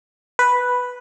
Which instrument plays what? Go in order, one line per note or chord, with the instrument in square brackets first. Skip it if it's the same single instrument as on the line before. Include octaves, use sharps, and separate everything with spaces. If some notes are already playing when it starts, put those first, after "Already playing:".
[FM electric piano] B4